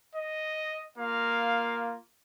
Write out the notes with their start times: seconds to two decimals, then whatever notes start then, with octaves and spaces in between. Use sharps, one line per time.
0.15 D#5
0.97 A#3 F4 F5